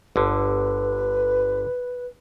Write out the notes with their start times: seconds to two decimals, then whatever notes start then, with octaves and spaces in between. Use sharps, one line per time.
0.16 G1 D3 B4